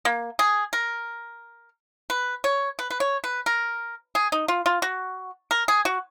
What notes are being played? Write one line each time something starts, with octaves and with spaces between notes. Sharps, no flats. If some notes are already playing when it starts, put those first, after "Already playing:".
A#3
G#4
A#4
B4
C#5
B4
B4
C#5
B4
A#4
G#4
D#4
F4
F4
F#4
A#4
G#4
F#4